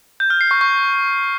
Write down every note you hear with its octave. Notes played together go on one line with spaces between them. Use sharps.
G6
F6
C7
C#6
C#6